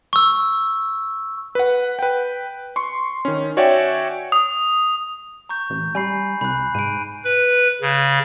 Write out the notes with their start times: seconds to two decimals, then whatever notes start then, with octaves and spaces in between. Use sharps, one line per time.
0.13 C#6 E6
1.55 B4 F#5
1.99 B4 G5
2.76 C6 C#6
3.25 D#3 C#4
3.57 F#4 C#5 D5 E5 G5 G#5
4.32 D#6
5.49 A#5 C#6 G6
5.70 A1
5.95 G3 G#5 B5 C7
6.41 C2 B5 F#6
6.75 G#2 D7 D#7
7.24 B4
7.81 C#3